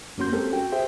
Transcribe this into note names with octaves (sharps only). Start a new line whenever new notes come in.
F#2 A#3 C#4 F#4 C6 G6
G#3 C4 C#4 G4 A4 A#4
F#4 G5
G4 G#4 C5 E5 G5